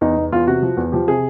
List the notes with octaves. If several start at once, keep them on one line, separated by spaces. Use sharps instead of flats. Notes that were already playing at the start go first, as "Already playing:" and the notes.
E2 D#4
E2
E2 F4
C3 F#4
F3
E2
F3 G4
C3 G#4